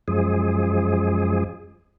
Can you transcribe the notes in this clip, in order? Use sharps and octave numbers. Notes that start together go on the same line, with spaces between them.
F#2 F3 G#3 G#4